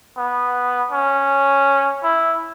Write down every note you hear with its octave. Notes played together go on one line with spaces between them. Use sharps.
B3
C#4
E4